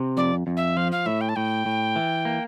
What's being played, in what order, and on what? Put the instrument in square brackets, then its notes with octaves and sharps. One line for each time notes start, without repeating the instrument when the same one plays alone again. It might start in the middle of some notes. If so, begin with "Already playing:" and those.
Already playing: [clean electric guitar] C3
[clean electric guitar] F2 [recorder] D5
[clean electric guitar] F2
[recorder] E5
[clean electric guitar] F3 [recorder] F5
[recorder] F5
[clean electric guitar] A2 [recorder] E5
[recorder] G5
A5
[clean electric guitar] A2 [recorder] G5
[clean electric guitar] A2
E3
A#3